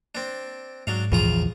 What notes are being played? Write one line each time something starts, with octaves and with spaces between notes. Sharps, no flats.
C4 D4
G#2 F#3 D4 F5
A#1 E2 C#3 F3 F4 A#5